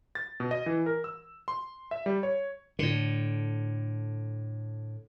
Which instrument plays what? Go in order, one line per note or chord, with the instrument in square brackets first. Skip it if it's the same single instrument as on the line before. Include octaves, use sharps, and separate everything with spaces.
[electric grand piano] A6
B2
D#5
E3
A#4
E6
C6
E5
G3
C#5
[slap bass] A2 D3